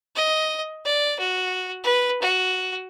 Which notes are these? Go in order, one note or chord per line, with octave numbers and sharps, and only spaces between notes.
D#5
D5
F#4
B4
F#4